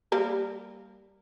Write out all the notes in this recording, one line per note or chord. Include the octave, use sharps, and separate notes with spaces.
G3 A#3 A#4